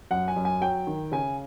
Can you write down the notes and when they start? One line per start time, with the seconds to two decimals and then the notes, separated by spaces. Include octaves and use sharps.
0.11 F#2 F#5
0.28 G#5
0.36 F#2
0.45 G#5
0.61 F#3 G5
0.87 D#3
1.12 C#3 G#5